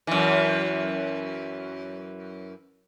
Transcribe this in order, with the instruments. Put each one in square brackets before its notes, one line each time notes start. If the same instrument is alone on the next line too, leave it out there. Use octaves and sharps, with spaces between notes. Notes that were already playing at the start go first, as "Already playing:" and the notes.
[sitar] F#2 E3